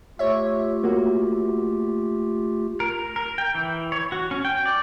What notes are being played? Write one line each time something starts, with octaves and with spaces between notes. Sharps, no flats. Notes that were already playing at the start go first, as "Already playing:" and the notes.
A3 F4 G4 C#5 E5
A#3 F#4
A#4
A#4
G5
E3
C#5
F#4
C#4
G5
D5